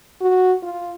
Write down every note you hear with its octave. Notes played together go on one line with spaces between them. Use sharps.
F#4
F4